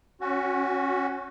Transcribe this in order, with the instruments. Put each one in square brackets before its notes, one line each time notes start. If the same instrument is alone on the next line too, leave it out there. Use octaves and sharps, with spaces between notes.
[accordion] C#4 F#4